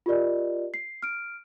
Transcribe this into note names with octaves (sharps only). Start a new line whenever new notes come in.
F4 G4 A#4 D5 D#5
C7
F6 D7